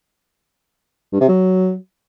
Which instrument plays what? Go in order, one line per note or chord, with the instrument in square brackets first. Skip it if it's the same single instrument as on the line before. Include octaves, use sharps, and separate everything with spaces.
[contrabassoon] G2
C3
F#3